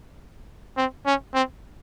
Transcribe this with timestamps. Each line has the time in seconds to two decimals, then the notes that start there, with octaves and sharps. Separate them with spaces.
0.77 C4
1.06 C#4
1.34 C4